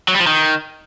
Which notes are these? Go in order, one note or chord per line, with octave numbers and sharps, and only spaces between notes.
F#3
G3
F3
D#3